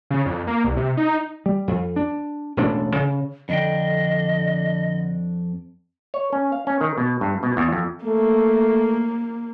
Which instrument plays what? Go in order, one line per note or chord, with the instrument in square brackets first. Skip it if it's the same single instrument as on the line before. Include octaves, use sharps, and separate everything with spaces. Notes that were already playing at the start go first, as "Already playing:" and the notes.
[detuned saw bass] C#3
F2
A#3
C2
C3
D#4
[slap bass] G3
F2
D4
E1 A1 D4
C#3
[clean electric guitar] F2 D4 G5 [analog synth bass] D3 [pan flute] D#5
[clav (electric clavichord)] C#5
C#4
F5
C#4
D#3
B2
G2
B2
E2
F2
[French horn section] A3 [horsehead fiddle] A#3